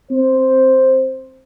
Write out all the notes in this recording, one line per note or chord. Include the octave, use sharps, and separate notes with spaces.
C4 C5